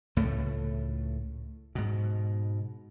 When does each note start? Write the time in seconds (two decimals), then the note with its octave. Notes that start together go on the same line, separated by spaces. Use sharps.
0.16 C#2 A2 A3
1.75 G#2 B2